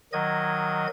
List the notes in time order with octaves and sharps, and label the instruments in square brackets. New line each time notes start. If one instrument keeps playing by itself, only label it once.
[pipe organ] D#3 F#3 D#5 G#6